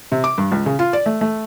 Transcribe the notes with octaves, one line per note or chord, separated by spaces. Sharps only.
C3
D6
G2
C#2
C#3
F4
D5
A3
A3